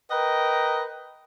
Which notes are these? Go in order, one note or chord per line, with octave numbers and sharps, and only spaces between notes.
A#4 B4 D#5 G5 A#5